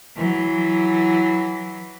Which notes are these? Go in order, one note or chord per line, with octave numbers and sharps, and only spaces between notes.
E3 F#3